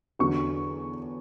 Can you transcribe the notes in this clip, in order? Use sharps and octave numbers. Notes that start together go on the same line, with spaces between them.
E2 D3 F#3 C#6